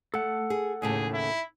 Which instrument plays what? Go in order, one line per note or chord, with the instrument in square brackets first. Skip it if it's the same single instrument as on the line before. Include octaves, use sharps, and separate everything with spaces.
[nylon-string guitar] A3 [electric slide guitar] A4 F#5
[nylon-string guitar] G#4
[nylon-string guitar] D#2 A2 C#3 [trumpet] G#4
[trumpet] E4